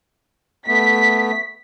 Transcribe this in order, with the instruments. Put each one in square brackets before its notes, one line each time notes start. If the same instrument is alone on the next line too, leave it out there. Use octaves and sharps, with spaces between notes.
[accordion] A3 B3 [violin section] B6